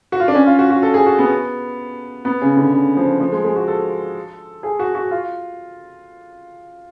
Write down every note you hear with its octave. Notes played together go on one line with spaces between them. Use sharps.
F#4
F4
D4
C#4
F4
F#4
F#4
A4
G#4
F#4
B3
B3
C#3
D3
C#3
F3
F3
G#3
G#3
F#4
A4
G#4
F#4
F#4
F4